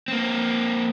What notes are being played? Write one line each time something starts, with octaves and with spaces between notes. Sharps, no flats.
A#3 C4